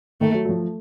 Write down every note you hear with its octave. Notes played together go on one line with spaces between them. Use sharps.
D#3 A3
F#3
F#3
F3